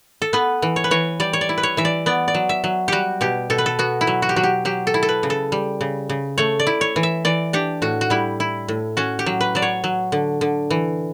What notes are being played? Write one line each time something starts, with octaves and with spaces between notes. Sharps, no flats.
A4
B3 B4
E3
C#5
B4
E3 C#5
G3 D5
C#5
D5
E4
B4
C#5
E3 E5
D5
B3 D5
D5
F#3
E5
F#3
G3 F#4 G4
B2 G4
B2 A4
B4
A4
B3 F#4
E4
F#3
F#4
G4
F#3 F#4
G4
F#3 G4
A4
E4
A4
B4
C#3
A4
G3
C#3
C#3
A3 C#5
D5
E4
C#5
E3
E5
E3 D5
D4 G4
A2 F#4
F#4
G3 E4
E4
A2
C#4 F#4
G4
F#3
B4
F#3 D5
C#5
F#3
D3
D3
E3